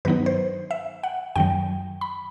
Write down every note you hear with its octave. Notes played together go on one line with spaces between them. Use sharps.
G2 D#3 F#3 B3 D#4 B4
C5
E5
F#5
F#2 D#3 F#3 G5
B5